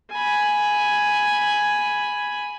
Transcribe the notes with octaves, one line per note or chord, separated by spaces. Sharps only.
G#5 B5